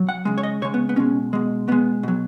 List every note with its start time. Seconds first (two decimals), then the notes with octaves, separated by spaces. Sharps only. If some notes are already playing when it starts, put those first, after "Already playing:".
Already playing: F#3
0.09 F#5
0.25 C#3 G#3
0.38 C#5
0.43 D#5
0.62 C#3 G#3 C#5
0.74 B3
0.89 B3
0.96 B2 G#3 C#4
1.33 B2 G#3
1.68 B2 G#3 B3
2.03 B2 F#3